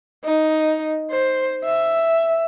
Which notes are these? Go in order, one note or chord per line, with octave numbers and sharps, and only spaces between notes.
D#4
C5
E5